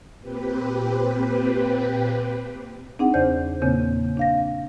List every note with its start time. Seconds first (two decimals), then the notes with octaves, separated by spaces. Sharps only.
0.21 A#2 C4 G4 B4
2.99 C4 D4 D#4 G#4 F#5
3.14 E2 C#3 C5 D5 G6
3.62 E2 A#2 C#3 A#3 C4 G6
4.17 D4 F5 A#6